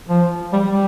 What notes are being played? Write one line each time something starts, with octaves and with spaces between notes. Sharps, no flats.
F3
G3
G3